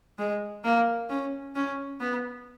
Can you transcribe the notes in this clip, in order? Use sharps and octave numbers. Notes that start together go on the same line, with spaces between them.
G#3
A#3
C#4
C#4
B3